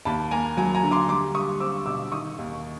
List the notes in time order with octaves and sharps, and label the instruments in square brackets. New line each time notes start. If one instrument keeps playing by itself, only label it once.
[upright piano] D#2 A5 B5
A#3 G#5 A#5
F#3 G#5 A#5
G#5 A#5
D3
C6 D6
G3 C6 D6
G3 C#6 D#6
C4 D6 E6
B2 D6 E6
D#3 C#6 D#6
D#2